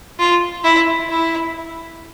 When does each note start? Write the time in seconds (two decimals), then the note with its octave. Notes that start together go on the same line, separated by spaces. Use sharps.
0.19 F4
0.64 E4
1.09 E4